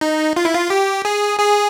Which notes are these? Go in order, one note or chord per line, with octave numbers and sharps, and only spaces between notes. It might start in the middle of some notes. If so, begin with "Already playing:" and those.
D#4
F4
E4
F4
G4
G#4
G#4